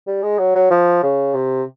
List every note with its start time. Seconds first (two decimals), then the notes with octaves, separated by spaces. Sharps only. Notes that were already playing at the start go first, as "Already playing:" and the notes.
0.07 G3
0.23 G#3
0.39 F#3
0.55 F#3
0.70 F3
1.03 C#3
1.34 C3